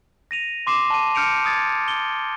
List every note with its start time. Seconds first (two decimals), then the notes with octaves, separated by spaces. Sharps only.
0.31 A#6 D#7 F7
0.67 C6 D6 C7 E7
0.90 A5 D#7
1.15 F6 G6 C#7 D7 F7
1.45 D#6 G#6 A6
1.88 G7